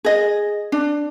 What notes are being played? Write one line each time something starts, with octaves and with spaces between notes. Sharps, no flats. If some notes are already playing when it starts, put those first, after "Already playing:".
G#4 D#5
D4